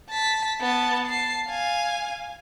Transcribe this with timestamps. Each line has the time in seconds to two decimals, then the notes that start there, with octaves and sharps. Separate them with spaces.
0.10 A5 B6
0.61 B3 A5
1.07 A5 C7
1.48 F5 G#5